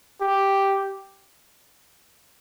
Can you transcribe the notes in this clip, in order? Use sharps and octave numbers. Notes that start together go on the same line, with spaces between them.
G4